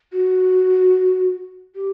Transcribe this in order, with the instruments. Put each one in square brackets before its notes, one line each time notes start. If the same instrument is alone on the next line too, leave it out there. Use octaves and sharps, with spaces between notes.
[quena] F#4
G4